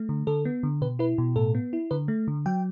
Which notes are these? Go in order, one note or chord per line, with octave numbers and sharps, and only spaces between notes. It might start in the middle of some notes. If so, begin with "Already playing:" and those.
Already playing: A3
D3
D3 A4
B3
D3
B2 B4
E4 B4
B2
A2 A4
B3
E4
D3 B4
A3
D3
F#3 G5